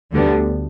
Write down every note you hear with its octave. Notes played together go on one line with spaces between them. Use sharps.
D2 D3 G3 B3